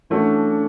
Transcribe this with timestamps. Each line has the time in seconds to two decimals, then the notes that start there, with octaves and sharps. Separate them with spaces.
0.10 E3 A3 C#4 D4 F#4